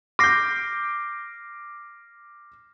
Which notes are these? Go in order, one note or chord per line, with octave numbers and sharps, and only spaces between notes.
D6 F6 G6 A#6 C7